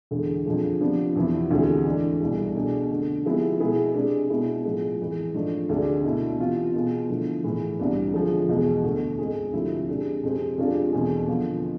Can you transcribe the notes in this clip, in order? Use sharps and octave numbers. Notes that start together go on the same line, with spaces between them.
E2 D3 G#3
F2 D3 F3 G#3
C3 F3 B3 D4
E2 C3 F3 B3 E4
D2 C3 E3 G#3
G#2 E3 A3 D4
C2 B2 A3 E4 G#4
B2 A3 D4 G#4
F2 D3 A3
C3 F3 G#3 B3 E4
B2 G#3 B3 E4 G#4
C3 G#3 D4 G#4
B2 G#3 B3 E4
A2 F3 G#3
F2 E3 G#3
G#2 F3 A3 D4
D2 C3 G#3 D4
B2 A3 E4
C3 E3 B3 F4
B2 B3 F4 G#4
D3 F3 A3 E4
A2 E3 B3 E4 G#4
C2 C3 E3 B3 D4
D3 F3 G#3
E2 B2 G#3 B3
D2 D3 A3
G#2 G#3 C4 G#4
D2 C3 F3 A3 E4
C3 G#3 D4
F2 C3 G#3 C4
F2 C3 G#3 D4 F4
E2 B2 A3 C4 G#4
D3 F3 B3 F4